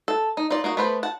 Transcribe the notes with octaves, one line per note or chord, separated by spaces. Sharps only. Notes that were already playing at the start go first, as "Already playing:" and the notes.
A4
D#4
D#4 F4 D5
A#3 D#4 F#4
A3 B3 B4 C5
F#5 A5